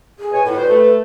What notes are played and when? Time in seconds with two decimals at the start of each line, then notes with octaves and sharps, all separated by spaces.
0.19 G#4
0.32 B2 C#5 G#5
0.45 A2 B4
0.56 G3 F#4 C5
0.68 A3